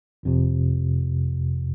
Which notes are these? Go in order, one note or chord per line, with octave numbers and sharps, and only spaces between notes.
G1 F2 C3